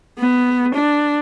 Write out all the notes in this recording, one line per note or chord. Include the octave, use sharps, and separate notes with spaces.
B3
D4